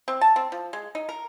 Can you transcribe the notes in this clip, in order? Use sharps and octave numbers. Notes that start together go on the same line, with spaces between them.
C4
A5
C4
F3
G#3
D#4
A#4